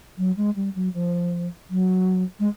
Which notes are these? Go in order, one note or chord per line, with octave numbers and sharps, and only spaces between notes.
F#3
G#3
G3
F#3
F3
F#3
G#3